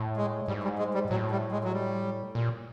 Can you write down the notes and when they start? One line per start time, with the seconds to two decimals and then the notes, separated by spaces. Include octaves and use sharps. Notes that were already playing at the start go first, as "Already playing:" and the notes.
Already playing: A2
0.17 G#3
0.48 G#2 G3
0.63 G3
0.79 G#3
0.94 G3
1.10 A2 F#3
1.31 G3
1.52 G#3
1.64 F#3
1.73 G3
2.35 A#2